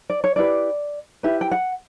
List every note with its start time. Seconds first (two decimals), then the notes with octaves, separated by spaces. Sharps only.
0.10 D5
0.24 C#5
0.36 E4 G4 B4 D5
1.23 E4 G4 B4 E5
1.41 G5
1.51 F#5